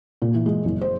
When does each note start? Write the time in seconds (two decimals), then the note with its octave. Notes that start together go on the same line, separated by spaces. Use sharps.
0.22 A#2
0.34 E3
0.46 G#3
0.65 F#1
0.81 C5